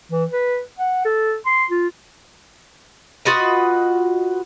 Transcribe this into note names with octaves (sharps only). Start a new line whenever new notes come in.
E3
B4
F#5
A4
C6
F4
F4 F#4 B4 D#5